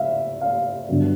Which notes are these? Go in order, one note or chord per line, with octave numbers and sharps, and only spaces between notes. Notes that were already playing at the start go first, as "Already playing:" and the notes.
Already playing: E5 F5
F5
G2 D3 F#3 B3